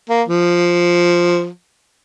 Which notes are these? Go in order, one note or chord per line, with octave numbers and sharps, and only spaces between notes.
A#3
F3